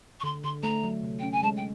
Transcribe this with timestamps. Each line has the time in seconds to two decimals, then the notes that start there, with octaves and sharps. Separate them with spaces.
0.20 C#6
0.23 D3 C6
0.44 D3 C6
0.63 A3 A#5
0.84 F#3
1.03 C3
1.19 C#4 G5
1.31 G#5
1.43 G#3 A5
1.56 G5